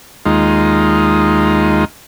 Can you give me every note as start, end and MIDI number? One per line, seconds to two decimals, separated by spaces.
0.26 1.85 39
0.26 1.85 56
0.26 1.85 63
0.26 1.85 65